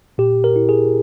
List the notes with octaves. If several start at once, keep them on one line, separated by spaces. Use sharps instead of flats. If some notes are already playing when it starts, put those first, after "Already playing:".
A#2 G4
A#4
E4
G#4